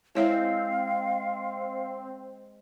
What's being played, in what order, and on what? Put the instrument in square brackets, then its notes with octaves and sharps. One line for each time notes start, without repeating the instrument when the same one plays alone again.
[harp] G#3 [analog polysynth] C4 [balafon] E4 C#5 E5 [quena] F5